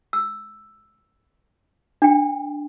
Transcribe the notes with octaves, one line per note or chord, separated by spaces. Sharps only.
E6
D4 G5